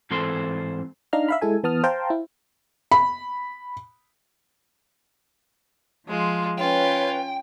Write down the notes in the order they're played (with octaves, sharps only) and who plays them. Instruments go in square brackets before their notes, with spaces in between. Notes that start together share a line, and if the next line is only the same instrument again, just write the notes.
[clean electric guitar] G#2 E3 C4 A4 C5 C6
[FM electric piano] D4 D#4 F5 A#5 F6
E5 F5 B5
G#3 E4 A4 G#5
E3 B3 A5 D#6 F6
C5 F5 G5 A5 A#5
E4
[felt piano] B5
[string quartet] F3 G#3 F4
[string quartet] C#4 [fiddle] F4 [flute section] B4 C#5 [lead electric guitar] G5